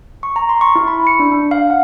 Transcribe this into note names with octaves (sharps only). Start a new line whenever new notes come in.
C#6
A#5
C6
C#6
E4
B5
C#7
D4
D4
F5
F#5